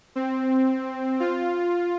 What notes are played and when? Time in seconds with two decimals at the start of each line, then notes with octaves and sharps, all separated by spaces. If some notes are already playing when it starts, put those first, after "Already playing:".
0.16 C4
1.20 F4